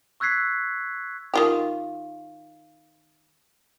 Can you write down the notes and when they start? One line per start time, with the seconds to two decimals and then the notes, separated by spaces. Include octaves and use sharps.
0.20 C#6 E6 F#6 G#6 B6 C7
1.34 D#3 F4 G4